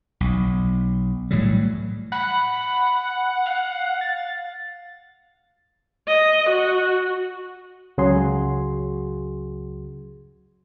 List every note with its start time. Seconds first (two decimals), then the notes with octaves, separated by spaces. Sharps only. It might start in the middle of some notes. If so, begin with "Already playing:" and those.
0.20 B1
1.31 A2 E3 F#3 G3
2.12 F#5 B5
3.46 F5
4.01 A6
6.08 D#5
6.50 F#4
7.98 C#2 C#3 F#3 F#4 G#4 C6